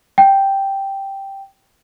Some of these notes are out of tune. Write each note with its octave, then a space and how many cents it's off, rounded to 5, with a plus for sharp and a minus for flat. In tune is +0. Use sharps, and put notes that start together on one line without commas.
G5 -5